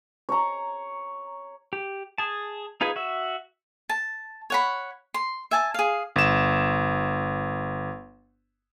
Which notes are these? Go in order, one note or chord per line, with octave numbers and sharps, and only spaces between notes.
C#5 A#5
G4
G#4 A5
D#4 F4 G#4 B4 G#5
F#4 E5
A5
C#5 F#5 B5
C6
E5 G#5 A5
G#4 F5
G1 E7